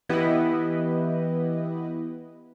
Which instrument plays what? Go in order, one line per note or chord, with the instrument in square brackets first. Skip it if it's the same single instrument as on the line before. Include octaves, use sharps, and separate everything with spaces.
[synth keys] E3 B3 E4 G4 B4 D#5